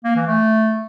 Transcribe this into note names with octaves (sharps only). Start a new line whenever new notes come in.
A#3
E3
A3